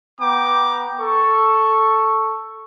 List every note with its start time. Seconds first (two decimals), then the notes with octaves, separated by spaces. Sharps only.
0.21 B3 G5 A#5 D6
1.00 A4 C#6